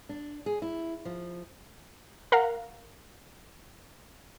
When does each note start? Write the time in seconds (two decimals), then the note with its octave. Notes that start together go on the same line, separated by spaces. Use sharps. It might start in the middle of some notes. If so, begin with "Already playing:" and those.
0.09 D4
0.46 G#4
0.62 E4
1.05 F3
2.32 A#4 F5 F#5 A#5